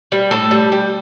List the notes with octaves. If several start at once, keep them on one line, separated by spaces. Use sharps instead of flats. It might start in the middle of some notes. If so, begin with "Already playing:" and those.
G3
A2 A4
G3
G3